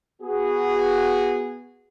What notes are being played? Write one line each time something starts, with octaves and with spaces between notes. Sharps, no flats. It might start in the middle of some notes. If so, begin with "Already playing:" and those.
B3 F#4 G#4